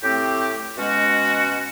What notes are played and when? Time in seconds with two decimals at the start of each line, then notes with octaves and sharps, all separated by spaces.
0.03 A2 A3 C4 G4
0.78 B2 G#3 C#4 F#4